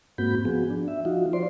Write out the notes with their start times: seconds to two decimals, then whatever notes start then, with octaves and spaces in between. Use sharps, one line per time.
0.18 G#2 A#3 C4 F#4 B5 G6
0.45 F3 B3 F#4 G#4
0.70 D4
0.88 E5
1.05 F3 D#4 F4 F#4
1.33 F4 C5 D5 C6